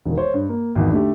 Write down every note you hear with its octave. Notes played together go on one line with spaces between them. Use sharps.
E1 D#3
C5 C#5
G2
A#3
G#1 E2
D3 A3 G4